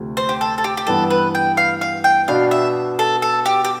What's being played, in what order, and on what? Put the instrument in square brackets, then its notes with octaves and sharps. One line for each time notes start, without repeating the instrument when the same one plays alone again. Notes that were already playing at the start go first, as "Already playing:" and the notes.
Already playing: [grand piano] D2 C3 F3 A3
[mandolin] C5
G4
A4
A4
G4
G4
[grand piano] G2 E3 B3 [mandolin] A4
[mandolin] B4
G5
F5
F5
G5
[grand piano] B2 B3 D4 [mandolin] F5
[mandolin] E5
A4
A4
G4
G4